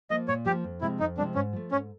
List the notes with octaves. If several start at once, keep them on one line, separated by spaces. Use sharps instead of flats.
F3 A#3 D#5
A#2 C#5
F3 A#3 G4
F2
C3 F3 G#3 C4 E4
F2 D#4
C3 F3 G#3 C4 D4
G#2 C#4
F3 A3
G#2 C#4